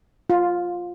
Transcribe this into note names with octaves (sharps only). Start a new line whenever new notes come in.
F4